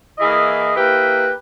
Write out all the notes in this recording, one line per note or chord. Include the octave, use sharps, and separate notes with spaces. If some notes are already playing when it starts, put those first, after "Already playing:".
E3 A#3 E4 G#4 D#5
A#3 E4 G4 B4